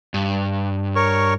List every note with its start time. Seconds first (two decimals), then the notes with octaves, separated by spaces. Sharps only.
0.14 G2
0.95 A#4 C#5 C#6